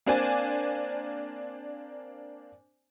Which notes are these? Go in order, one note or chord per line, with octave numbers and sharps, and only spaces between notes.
A#3 C4 D4 C5 D5 G#5